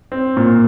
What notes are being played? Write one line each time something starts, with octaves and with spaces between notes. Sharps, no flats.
C4
A#2